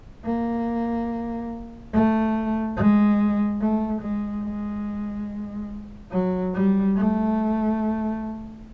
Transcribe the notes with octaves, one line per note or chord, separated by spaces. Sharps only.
A#3
A3
G#3
A3
G#3
G#3
F#3
G3
A3